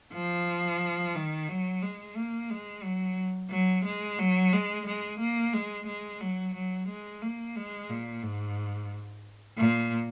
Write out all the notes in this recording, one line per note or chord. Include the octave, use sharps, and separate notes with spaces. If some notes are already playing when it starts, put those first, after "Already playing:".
F3
D#3
F#3
G#3
A#3
G#3
F#3
F#3
G#3
F#3
G#3
G#3
A#3
G#3
G#3
F#3
F#3
G#3
A#3
G#3
A#2
G#2
A#2